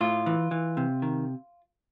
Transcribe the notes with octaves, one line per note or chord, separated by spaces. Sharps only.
A2 F4
E3
E3
C3
D#3